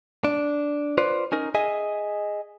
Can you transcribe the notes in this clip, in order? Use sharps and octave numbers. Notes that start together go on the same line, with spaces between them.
D4
F4 B4 C5 D5
C#4 D#4 A#4
G#4 D#5 E5 G#5